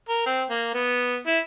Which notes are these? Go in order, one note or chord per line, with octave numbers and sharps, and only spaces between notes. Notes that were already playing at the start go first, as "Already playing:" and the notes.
A#4
C4
A#3
B3
E4